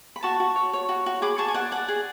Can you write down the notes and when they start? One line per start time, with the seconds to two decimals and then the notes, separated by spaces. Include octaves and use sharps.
0.16 B5
0.23 F#4 A5 C#6
0.40 F#4
0.56 C#5
0.73 C#5
0.89 F#4
1.06 F#4
1.22 G#4 B5 D6
1.38 G#4 A5 C#6
1.48 G#5
1.54 D5 F#5 A5
1.72 D5 F#5
1.88 G#4